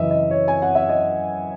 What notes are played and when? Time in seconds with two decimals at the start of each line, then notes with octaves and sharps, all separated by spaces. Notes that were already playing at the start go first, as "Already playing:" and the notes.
Already playing: F#2 C#3 E3 D#5 E5
0.11 D#5
0.31 C#5
0.48 G#5
0.62 F#5
0.75 E5
0.89 D#5